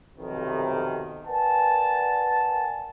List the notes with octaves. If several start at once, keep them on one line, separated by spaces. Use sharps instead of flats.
B1 F2 C3 D#3
A#4 B4 D5 F#5 G#5 A5